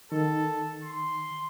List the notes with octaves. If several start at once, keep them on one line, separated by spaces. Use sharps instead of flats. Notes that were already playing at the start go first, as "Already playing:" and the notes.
D#3 A4
C6